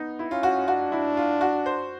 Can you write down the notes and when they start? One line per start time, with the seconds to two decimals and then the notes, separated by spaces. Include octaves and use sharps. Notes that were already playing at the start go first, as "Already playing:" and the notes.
Already playing: B3 D#4
0.19 E4
0.31 C#4 F4
0.43 F#4
0.68 D4 F#4
0.92 E4
1.17 F4
1.41 F#4
1.66 C5